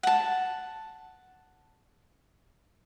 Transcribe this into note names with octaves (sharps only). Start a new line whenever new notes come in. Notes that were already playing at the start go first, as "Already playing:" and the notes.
F#5 A5